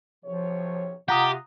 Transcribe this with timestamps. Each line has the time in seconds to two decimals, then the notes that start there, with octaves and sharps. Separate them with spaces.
0.25 B1 C3 F3 C#5
1.09 C3 F4 G4 F#5 A#5 D#6